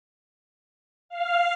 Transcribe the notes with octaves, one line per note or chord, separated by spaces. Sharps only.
F5